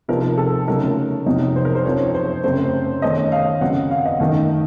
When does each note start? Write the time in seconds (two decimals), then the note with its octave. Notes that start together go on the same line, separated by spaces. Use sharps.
0.08 C3 F3 C4 D#4 A#4
0.38 A4
0.67 C#3 F#3 A3 D#4 A#4
1.26 F2 C3 F#3 C4 D#4
1.56 C5
1.65 A#4
1.75 C5
1.85 F#2 F3 C4 D#4 C#5
2.14 C5
2.44 F#2 C#3 A3 C4 C5
3.02 D#3 A3 C#4 D#5
3.32 F5
3.61 F#2 C#3 F#3 C4 F#5
3.91 F5
4.06 D#5
4.20 F#2 D#3 A3 D#4